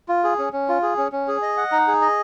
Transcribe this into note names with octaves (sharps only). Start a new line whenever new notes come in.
F4
G#4
C#4
C#4
F4
G#4
C#4
C#4
G#4
D#5
F#5
D#4
G#4
D#5